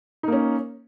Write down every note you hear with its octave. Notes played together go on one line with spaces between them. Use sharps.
A#3 C#4 D#4